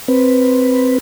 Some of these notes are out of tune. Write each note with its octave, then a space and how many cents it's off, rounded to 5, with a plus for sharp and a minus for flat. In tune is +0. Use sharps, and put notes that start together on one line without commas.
C4 +0 B4 +0